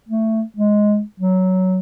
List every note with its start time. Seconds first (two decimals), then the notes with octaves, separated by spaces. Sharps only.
0.09 A3
0.56 G#3
1.20 F#3